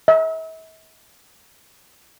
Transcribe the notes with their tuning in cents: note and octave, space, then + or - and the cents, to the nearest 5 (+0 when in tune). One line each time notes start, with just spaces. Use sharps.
E5 -45